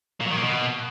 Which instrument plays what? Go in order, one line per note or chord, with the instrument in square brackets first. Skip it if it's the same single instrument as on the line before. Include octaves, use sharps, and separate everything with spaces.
[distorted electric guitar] A#2
F#3
D#3
A#3
B2